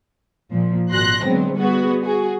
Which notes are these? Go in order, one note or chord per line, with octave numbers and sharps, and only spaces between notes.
A#2 F3
G#1 A#2 F#4 C6 F#6 A#6
D3 F#3 G#3 B3 C4
G3 B3 F#4 G#4
F#4 G#4